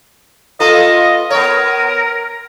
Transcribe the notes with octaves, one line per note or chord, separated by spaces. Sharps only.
B3 F4 A4 D#5
B3 A#4 C#5